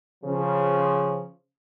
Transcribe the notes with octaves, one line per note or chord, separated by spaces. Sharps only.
C#3 F3